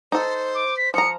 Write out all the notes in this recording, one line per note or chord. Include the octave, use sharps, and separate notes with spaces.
D#4 A4 C5
D6
B6
F3 A#5 D#6 C#7